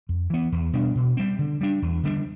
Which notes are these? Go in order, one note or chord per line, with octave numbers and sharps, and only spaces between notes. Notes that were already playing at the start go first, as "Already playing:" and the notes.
F2
E3 B3
E2
B2 G3 D4
B2
G3 C4
D3
G3 D4
E2
D3 G3 D4